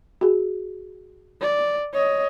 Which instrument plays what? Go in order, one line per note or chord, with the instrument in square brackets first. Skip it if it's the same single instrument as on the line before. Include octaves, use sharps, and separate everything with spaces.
[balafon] F#4 G#4
[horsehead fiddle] D5
C#5 D#5